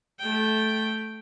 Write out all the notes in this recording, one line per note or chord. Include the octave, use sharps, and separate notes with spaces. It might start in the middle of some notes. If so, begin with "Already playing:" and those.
A3 G5